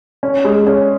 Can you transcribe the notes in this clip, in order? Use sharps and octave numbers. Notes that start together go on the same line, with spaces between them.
C#4
G#3
C#4